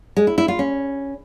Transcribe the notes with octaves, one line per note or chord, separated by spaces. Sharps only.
G#3
E4
E4
F4
C#4